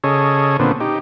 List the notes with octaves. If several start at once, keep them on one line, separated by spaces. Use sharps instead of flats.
C#3 G#4 A4 C#5 D#5
A#2 D3 B3 C4
D#4 G4